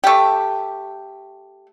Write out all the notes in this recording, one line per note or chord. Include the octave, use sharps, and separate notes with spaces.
A3 G4